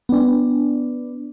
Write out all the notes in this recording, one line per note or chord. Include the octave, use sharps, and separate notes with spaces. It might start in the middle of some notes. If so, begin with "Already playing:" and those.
B3 D4